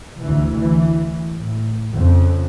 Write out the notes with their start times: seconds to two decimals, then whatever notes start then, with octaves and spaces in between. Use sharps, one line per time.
0.21 D2 E3
0.56 E3
1.33 A2
1.91 F2 C#3